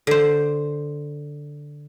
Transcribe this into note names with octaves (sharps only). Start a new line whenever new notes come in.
D3 C5